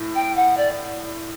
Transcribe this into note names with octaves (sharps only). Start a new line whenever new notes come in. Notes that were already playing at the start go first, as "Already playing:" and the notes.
Already playing: A2
G5
F#5
D5